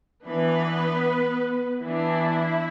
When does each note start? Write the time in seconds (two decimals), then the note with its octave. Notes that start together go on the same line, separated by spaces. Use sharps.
0.24 E3 B3 D4 B4
1.82 E3 B3 D4 E4